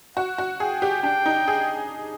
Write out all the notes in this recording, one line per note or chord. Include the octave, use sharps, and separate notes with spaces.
F#4 F#5
F#4
G#4 G5
G4
D4 G5
D#4
G#4